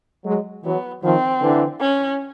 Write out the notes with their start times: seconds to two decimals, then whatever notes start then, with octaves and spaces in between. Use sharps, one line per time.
0.25 F#3 G#3
0.64 E3 F#3 B3
1.03 D#3 F3 C4
1.41 D3 E3
1.80 C#4